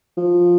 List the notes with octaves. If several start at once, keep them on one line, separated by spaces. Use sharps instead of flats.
F3